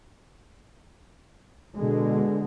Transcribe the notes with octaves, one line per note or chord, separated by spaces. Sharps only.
B2 D3 G#3